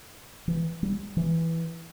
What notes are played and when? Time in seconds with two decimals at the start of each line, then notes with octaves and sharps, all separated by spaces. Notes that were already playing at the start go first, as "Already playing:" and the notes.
0.48 E3
0.83 G3
1.17 E3